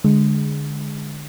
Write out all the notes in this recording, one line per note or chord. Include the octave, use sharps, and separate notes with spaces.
D3 G#3